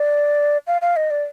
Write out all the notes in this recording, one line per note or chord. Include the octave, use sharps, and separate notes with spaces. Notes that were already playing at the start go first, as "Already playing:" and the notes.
Already playing: D5
F5
F5
D#5
D5